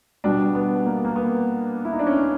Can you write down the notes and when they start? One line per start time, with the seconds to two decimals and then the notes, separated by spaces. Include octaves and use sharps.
0.24 B2 G3 D4
0.55 B3
0.85 A#3
1.05 A#3
1.16 B3
1.85 E4
1.92 D#4
1.99 D4
2.07 C#4